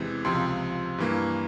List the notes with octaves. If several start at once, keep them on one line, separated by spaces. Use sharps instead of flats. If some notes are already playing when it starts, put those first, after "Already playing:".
Already playing: E2 C3 E3 G#3
C#2 C3 F3 C6
G2 E3 A#3